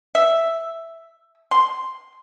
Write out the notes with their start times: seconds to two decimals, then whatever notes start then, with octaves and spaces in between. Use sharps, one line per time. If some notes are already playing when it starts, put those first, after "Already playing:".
0.15 E5
1.51 C6